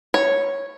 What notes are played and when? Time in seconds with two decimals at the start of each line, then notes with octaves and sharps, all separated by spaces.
0.14 C#5